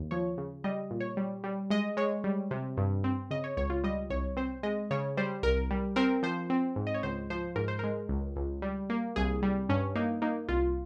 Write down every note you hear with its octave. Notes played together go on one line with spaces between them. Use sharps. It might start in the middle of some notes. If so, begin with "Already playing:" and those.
Already playing: D#2
F3 C#5
C#3
G3 D#5
A#2
C#5
G3
G3
G#3 D#5
G#3 C#5
G3
C3
G2
C4
C#3 D#5
C#5
C#2 C#5
F4
G3 D#5
C2 C#5
C4 C5
G#3 D#5
C#3 C#5
G3 C5
C2 A#4
G3
C4 A#4
F3 C5
C4
G#2
D#5
C#5
C#2 C5
F3 C5
G#2 A#4
C5
G#3 A#4
C#2
C#2
G3
A#3
C2 G#4
G3
G2 C#4
A#3 D#4
A#3 D#4
C2 F4